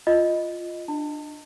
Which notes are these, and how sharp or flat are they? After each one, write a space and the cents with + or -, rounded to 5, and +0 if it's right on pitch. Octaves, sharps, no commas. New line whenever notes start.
F4 +0 D#5 +0
D4 +20 A5 +35